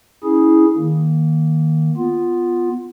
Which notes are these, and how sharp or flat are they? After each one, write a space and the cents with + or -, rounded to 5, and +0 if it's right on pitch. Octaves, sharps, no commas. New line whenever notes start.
C#4 +0 E4 -25 G#4 +0
D#3 +0 A#3 +0
B3 +0 F4 +0